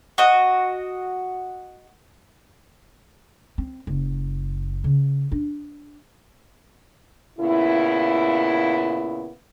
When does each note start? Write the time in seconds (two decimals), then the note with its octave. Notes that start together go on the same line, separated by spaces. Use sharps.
0.18 F#4 D#5
3.58 C4
3.87 F#1
4.84 C#3
5.32 D4
7.39 A#2 C#3 B3 E4